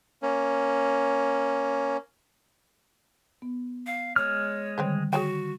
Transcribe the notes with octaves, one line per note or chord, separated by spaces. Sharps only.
A#3 C#4
B3
F5
G#3 C#5 F6
D3 D#3 G3 C4 B4 C5
F#4 G#4 C#5 G5